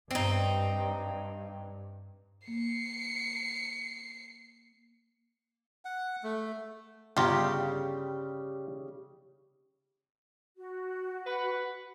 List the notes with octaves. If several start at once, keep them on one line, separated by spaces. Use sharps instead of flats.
G2 C4 D#4
A#3 C7 C#7
F#5
A3
G1 C#3 G3 F4 G5 A#5
F#4
B4 F#5